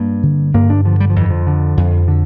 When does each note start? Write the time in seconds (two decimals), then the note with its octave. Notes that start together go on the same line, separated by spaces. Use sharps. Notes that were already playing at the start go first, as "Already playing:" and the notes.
Already playing: G2 A#3
0.23 D3
0.54 G2 A#3
0.70 D4
0.85 D3 F3
1.00 G3
1.10 F3
1.16 F2 E3
1.30 F3
1.47 D3
1.77 F2
2.08 D3